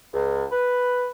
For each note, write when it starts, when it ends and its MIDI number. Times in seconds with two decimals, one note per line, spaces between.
0.13 0.45 37
0.52 1.09 71